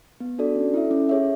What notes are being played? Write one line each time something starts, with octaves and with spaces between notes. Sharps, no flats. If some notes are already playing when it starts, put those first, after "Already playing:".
B3
D4 F#4 A4 D5
C#4
E4 A4 E5
C#4
G#4 C#5 E5